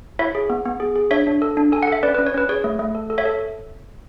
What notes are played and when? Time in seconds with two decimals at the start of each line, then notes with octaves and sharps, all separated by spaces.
0.19 E4 C#5 E5
0.35 G#4
0.50 B3
0.66 B3
0.80 G#4
0.95 G#4
1.11 D4 C#5 E5
1.27 D4
1.42 A4
1.57 D4
1.72 A4 G#5
1.83 A4 F#5
1.92 E5
2.03 C#4 B4 D5
2.15 B4
2.18 C#4
2.27 C#5
2.34 C#4 B4
2.49 G#4 C#5
2.64 A3
2.79 A3
2.95 A4
3.10 A4
3.18 C#5 E5
3.25 A4